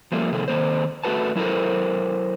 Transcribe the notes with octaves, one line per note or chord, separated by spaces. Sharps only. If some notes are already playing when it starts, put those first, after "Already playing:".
F3 G3 A3 A#3
C3 D#3 A#3 A4
D#3 A#3 C4 C5
A3 F#4 B4 A5
F#3 E4 A4 A#4 C5